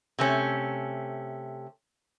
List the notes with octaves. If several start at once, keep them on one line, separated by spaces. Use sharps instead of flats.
C3 A3 C#4